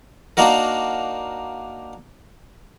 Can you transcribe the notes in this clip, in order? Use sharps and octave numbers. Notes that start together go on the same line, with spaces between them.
A#3 D4 D#4 F#4 A#4